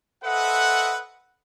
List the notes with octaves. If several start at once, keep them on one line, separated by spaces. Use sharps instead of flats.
A4 B4 C5 D#5 E5 F#5